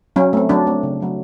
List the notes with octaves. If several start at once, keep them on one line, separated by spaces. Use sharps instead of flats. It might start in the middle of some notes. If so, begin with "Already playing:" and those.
F#3 C#4
A3 C4
F#3 D4
A3 C4
C#3
F#3 A3 C#4